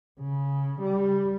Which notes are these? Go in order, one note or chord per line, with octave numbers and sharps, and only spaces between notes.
C#3
G3